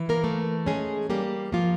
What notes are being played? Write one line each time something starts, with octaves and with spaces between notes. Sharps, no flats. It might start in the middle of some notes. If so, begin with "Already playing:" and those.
Already playing: E3
A#3 A#4
A3
G#3 C#4 G#4
G3 A#3 G4
F3 A#3 F4